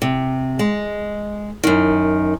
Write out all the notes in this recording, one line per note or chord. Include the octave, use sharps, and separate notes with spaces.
C3
G#3
F#2 D#3